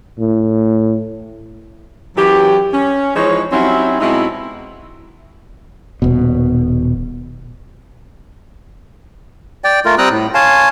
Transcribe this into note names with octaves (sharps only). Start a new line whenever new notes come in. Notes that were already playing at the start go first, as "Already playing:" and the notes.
A2
F#2 E3 F#3 G4
C#4
E3 F3 G#3 D#4 C#5
F#3 G3 C4 C#4 D#4 E4
B2 G#3 C4 D#4 E4
D#1 B2
D5 G5
A3 F4 A#4
G3 C4 G5 A#5 D#6 F#6
A2
C#5 F5 G#5 A5 C6